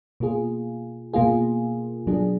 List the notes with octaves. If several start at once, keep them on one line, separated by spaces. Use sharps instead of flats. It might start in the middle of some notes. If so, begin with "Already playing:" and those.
B2 A#3 F4 G#4
B2 A#3 F4 G#4
B2 F#3 D4 G#4